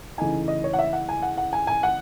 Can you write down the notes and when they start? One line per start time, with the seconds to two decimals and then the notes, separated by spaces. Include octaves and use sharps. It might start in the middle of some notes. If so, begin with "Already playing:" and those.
0.18 C#3 E3 A3 D#4 G#5
0.48 D#5
0.64 C#5
0.73 F#5
0.79 E5
0.93 F#5
1.09 G#5
1.23 F#5
1.38 F#5
1.53 G#5
1.67 G#5
1.83 F#5